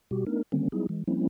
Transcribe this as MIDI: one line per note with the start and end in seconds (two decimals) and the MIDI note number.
0.11 0.25 47
0.11 0.25 55
0.11 0.25 66
0.11 0.25 67
0.27 0.43 57
0.27 0.43 59
0.27 0.43 62
0.27 0.43 63
0.27 0.43 70
0.52 0.68 50
0.52 0.68 51
0.52 0.68 55
0.52 0.68 58
0.52 0.68 60
0.52 0.68 61
0.72 0.87 54
0.72 0.87 55
0.72 0.87 59
0.72 0.87 63
0.72 0.87 64
0.72 0.87 68
0.89 1.04 52
0.89 1.04 56
1.07 1.27 53
1.07 1.27 55
1.07 1.27 58
1.07 1.27 60
1.07 1.27 61
1.07 1.27 64